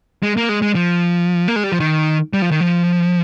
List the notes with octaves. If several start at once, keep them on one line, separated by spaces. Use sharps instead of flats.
G#3
A#3
G#3
G#3
F3
A#3
G#3
G3
F3
D#3
G3
F3
D#3
F3